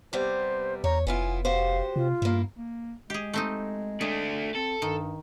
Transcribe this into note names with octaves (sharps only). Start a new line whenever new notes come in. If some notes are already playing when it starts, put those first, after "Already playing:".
C3 G3 B3 C5
E2 C#5 A#5
F1 B3 E4 F4 G#5
F#4 G4 C5 F5
C3 F4
G2 A#3 E4
A#3
G#3 G4 G#4
A3 C4 D#4
A3 D4 G#4
C4 A4
G2 D#3